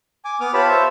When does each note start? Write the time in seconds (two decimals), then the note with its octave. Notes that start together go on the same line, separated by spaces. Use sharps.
0.25 G#5 D6
0.41 B3 D6 D#6 F6
0.54 F4 G4 B4 C#5 A5 B5
0.68 C5 C#5 E5 A5